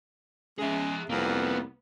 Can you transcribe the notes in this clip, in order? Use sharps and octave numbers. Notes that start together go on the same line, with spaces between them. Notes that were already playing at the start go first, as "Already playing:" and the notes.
G#3 C#4 G#4 E5
C2 F2 A#3 B3